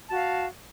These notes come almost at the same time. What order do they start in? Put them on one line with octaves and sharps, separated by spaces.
A5 F#4 F5